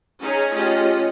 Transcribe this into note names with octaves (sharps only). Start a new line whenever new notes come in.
C#4 D#4 G#4 A#5
A3 C#4 F4 G4 G#4 D#5